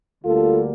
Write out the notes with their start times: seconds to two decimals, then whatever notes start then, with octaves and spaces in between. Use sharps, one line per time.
0.24 D2 D3 G3 A#3 F4 A4